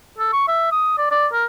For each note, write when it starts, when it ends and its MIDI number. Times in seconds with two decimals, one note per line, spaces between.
0.19 0.32 69
0.33 0.48 85
0.48 0.71 76
0.72 0.95 87
0.98 1.10 74
1.11 1.27 74
1.33 1.45 70